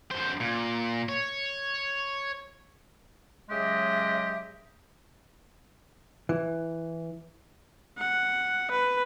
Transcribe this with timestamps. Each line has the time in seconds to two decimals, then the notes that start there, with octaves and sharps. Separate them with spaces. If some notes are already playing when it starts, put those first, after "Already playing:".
0.11 F#2 C5
0.40 A#2
1.09 C#5
3.49 C#3 F#3 G#3 G4 D#5 E5
6.29 E3
7.99 F#5
8.71 B4